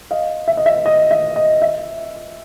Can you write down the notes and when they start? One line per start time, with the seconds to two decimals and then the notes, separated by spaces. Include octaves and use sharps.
0.11 D#5 F5
0.48 E5
0.57 D#5
0.66 E5
0.86 D#5
1.11 E5
1.36 D#5
1.62 E5